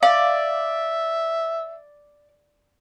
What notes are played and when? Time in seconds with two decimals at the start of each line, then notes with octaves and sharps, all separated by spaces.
0.03 D5 E5 F5